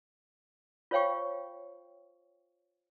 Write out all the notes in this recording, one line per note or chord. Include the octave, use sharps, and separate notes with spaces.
F4 C5 C#5 F5 G5 C#6